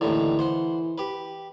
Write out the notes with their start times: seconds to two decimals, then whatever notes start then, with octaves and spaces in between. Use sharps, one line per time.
0.01 D#2 A2 D3 E3
0.39 C5 F#5 C6
0.98 G4 B4